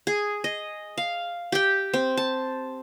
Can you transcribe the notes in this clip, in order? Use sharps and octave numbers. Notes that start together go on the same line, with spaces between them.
G#4
D#5
F5
G4 G5
C4
A5